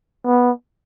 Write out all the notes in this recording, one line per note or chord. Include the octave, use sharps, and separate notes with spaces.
B3